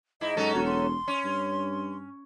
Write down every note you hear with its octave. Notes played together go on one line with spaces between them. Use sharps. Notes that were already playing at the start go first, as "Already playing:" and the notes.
G#2 E4 D#5
G#2 F#3 C#4 A4
E1 F#4
C6
C#4
G2